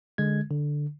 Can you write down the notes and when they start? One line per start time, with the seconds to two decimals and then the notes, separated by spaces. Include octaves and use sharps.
0.18 D3 G#3 G#6
0.50 D3